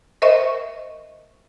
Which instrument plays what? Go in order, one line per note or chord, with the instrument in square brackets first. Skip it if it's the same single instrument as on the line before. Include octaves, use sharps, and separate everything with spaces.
[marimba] A#4 C5 D#5 E5 C#6